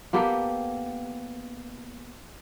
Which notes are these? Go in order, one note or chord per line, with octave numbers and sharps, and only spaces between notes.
A#3 B3 G4 A4